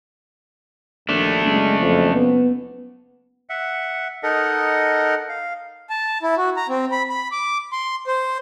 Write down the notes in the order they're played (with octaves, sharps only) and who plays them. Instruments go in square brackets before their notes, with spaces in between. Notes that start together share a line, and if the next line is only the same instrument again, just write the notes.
[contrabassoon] A#1 [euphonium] D#2 [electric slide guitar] A3 D4
[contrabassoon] F#1 [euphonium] G#3
[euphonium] F2
B3
[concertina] E5 F#5
D#4 A4 A#4 D#5 F#5
F5
[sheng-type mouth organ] A5
E4
F#4
A#5
C4
B5
B5
D6
C6
C5